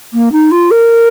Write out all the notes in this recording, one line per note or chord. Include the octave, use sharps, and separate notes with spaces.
A#3
D#4
F4
A#4